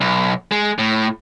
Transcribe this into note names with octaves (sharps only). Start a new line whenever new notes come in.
B1
G#3
A2